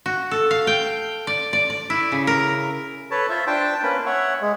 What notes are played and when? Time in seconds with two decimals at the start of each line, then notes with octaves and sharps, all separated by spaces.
0.06 F#4
0.31 A4
0.51 F5
0.67 G5
1.27 D5
1.53 D5
1.70 D5
1.90 E4
2.12 C#3
2.27 A#4
3.11 A4 B4 C#5 A5
3.30 F4 C5 E5
3.47 D4 C5 G5 A5
3.83 A#3 C#4 B4
4.06 C#5 E5 F#5
4.41 G#3